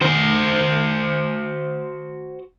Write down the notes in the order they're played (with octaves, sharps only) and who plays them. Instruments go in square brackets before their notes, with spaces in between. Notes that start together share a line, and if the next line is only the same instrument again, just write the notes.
[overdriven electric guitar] F#4 C5